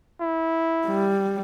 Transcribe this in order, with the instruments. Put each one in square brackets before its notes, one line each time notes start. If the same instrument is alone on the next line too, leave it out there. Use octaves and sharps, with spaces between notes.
[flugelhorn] E4
[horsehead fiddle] G3